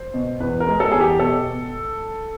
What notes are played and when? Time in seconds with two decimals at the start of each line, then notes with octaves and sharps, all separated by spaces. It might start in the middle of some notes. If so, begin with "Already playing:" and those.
Already playing: C5
0.14 B2
0.40 E2 B4
0.60 A#4
0.67 G#3
0.80 A4
0.92 E2 G#4
1.00 G4
1.19 B2 A4